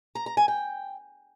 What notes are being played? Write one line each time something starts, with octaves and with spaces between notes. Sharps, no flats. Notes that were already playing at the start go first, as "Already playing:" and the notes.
A#5
A#5
G#5
G5